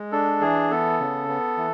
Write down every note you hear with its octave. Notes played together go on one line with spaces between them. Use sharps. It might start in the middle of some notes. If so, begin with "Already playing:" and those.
Already playing: G#3
D4 A4
E3 G#4
B3 A4
C#3
B3
E3